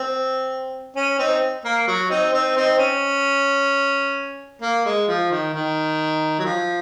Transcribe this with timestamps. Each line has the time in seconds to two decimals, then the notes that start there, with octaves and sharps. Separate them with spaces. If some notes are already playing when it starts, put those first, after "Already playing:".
Already playing: C4
0.96 C#4
1.18 C4 D#4
1.65 A#3
1.87 F#3
2.10 C4 D#4
2.33 C4 D#4
2.56 C4 D#4
2.79 C#4
4.62 A#3
4.85 G#3
5.08 F3
5.31 D#3
5.54 D#3
6.39 F#3
6.45 F3